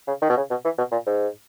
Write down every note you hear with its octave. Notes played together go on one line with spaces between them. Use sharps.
C#3
D#3
B2
C#3
B2
E3
B2
A#2
G#2